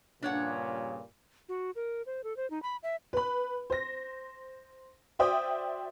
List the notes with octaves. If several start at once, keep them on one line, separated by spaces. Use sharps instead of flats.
G2 A#2 C#3 D4 C#5 F#5
F#4
A#4
C5
A4
C5
D#4
B5
E5
B4 B5
C5 A#6
F#4 C5 D5 E5 G5 D#6